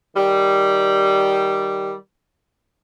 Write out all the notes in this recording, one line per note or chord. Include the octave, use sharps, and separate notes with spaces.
D#3 G3